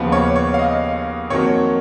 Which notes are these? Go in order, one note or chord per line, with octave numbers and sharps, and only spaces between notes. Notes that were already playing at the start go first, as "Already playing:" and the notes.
Already playing: D#2 C#3 F3 B3
C#5
C#5
F5
D#5
F2 D#3 F#3 A#3 C#5